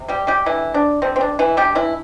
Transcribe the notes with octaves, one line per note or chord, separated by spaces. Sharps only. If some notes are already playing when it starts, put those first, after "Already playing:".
Already playing: C3
G3 G4
G3 G4
D3 E3 G3 E4
D4
D3 G3 C4
C4
D4
E3 E4
D3 G3 A3 G4
E3 E4